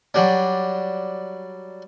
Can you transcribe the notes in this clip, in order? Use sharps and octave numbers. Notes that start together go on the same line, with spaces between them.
F#3 G3 D4